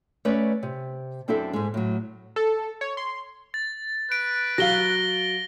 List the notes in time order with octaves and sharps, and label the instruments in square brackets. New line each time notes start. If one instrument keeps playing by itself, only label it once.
[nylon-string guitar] A3 C#4 B4 C#5 D5
C3
F#2 C4 D4 E4 A4 E5
G#2 G#3
A2 F#3
[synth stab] A4
C#5
C6
[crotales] A6
[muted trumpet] B4 [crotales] D7
[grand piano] F#3 F5 [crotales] A#6 G7